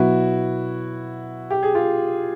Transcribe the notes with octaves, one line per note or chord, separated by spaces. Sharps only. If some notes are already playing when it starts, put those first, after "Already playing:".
Already playing: B2 F#3 B3 E4 F#4
G4
G#4
F4 G4